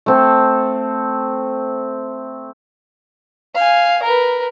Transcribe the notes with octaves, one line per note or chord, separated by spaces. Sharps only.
A3 C4 A4
F5 G#5
A#4 B4